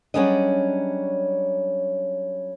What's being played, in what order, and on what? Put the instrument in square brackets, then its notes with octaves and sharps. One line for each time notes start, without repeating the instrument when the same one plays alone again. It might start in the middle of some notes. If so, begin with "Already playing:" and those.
[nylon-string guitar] F#3 G3 C#4 D4 G#4 D#5